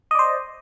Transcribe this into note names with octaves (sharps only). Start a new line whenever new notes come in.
C5 D5 D#5